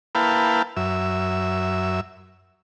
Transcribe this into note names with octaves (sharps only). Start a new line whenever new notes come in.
A#3 E4 B4 F5 G5 A5
F#2 E5